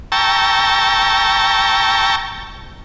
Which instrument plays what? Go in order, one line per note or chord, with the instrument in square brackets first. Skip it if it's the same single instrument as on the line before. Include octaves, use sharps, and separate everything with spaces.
[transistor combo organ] G5 A5 A#5 C#6 E6